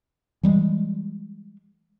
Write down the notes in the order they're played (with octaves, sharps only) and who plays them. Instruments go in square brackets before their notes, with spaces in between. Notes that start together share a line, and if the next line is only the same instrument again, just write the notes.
[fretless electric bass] E3 G3 G#3